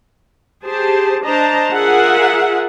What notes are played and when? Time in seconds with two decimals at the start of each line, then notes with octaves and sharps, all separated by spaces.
0.66 G4 G#4 C5 A5
1.25 D4 C5 D#5 A5 A#5
1.73 F4 G#4 A#4 E5 F#5